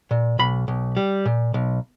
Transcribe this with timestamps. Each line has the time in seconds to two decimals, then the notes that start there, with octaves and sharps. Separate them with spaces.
0.11 A#2
0.39 B1 B5
0.68 B1
0.97 G3
1.25 A#2
1.54 B1